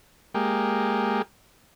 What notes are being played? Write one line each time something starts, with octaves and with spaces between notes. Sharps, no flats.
G#3 A#3 G4